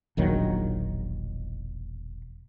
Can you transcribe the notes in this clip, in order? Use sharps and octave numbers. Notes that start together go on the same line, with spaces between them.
E1 A#1 D#3 F#3